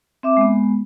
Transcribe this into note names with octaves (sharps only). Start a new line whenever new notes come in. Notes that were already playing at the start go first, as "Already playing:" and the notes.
C4 E5 D6
G#3 B3